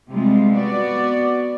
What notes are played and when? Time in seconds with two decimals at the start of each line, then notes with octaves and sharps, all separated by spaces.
0.11 C3 G3 G#3 F4
0.54 B3 F#4 D5